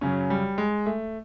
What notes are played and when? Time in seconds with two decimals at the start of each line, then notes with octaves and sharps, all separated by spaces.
0.01 F#2 C#3 F#3 C#4
0.30 G3
0.58 G#3
0.86 A3